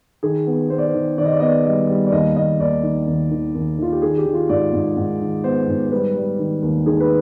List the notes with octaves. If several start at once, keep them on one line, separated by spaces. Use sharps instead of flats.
D#3 G#4
B3
B3 C5
D5
C5
D#3
D#3 D5
D#5
D5
B3 D#5
D5
G3 D#5
G3
D5
D#2 D#5
D#2 D#5
D#2 D5
D#3
D#2
D#3
D#2
D#3 F4
G4
D#3 G#4
G4
D#3
F4
G#2 D5
G#2
G#2
D#3
B3 C5
G#2
C5
G3 B4
G3
D#3
D#2
D#3 G#4
B4